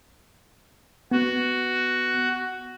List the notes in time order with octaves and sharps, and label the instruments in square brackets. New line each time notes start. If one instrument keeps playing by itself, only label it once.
[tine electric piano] B3 [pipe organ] F#4